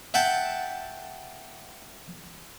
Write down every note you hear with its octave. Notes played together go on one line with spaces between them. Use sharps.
E5 F#5 G5 A5